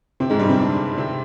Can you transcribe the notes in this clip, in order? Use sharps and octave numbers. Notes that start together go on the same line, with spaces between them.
C3 C4
G#2 G#3
G2 G3
C3 C4
D3 D4
C3 C4